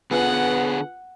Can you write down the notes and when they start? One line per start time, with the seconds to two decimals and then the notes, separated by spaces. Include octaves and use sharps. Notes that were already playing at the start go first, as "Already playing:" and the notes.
0.11 D3 B3 F4 G#4 B4 F#5 G#5